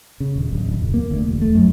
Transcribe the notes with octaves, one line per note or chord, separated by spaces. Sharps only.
C#3
D#1
D1
D1
F1
A#3
D2
E1
A3
F#2